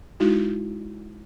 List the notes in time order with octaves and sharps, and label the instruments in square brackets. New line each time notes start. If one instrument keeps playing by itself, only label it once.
[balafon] G#3 D#4 E4 F#4